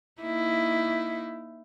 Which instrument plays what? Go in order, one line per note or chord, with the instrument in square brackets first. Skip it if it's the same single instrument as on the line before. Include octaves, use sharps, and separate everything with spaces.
[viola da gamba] A#3 D#4 E4